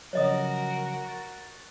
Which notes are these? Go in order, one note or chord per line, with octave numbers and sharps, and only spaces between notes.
C#3 F3 F#3 F#4 A#4 C#5 D#5 D#6
C#6 F#6 A6